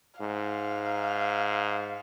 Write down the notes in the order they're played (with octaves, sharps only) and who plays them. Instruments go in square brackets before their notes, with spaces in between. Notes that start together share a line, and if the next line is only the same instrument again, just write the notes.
[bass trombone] G#2 [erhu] F5